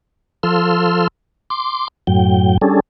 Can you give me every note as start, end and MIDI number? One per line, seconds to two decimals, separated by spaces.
0.43 1.08 53
0.43 1.08 69
0.43 1.08 84
0.43 1.08 88
0.43 1.08 89
1.50 1.88 84
1.50 1.88 86
2.07 2.58 42
2.07 2.58 45
2.07 2.58 54
2.07 2.58 79
2.62 2.80 55
2.62 2.80 61
2.62 2.80 62
2.62 2.80 68
2.62 2.80 69